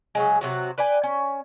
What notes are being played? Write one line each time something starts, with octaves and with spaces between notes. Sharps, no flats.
C#3 F#3 G#3
C3 F#3 F#4
B4 D5 G5 G#5
C#4